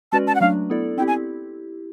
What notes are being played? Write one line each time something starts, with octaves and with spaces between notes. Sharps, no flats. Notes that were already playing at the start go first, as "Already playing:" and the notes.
G#3 C#4 F#4 B4 D5 A5
A5
F#5
F#3 A3 D4 F5
B3 E4 A4 D5
C4 E4 G4 G5
G#5